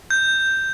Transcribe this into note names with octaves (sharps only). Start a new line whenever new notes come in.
G6